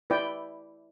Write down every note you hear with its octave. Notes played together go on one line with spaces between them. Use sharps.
E4 B4 D5 G5